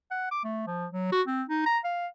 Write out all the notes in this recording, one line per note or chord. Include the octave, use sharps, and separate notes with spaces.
F#5
D6
A3
F3
F#3
F#4
C4
D#4
A#5
F5